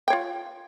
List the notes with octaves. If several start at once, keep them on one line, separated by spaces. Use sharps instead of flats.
F4 C#5 G5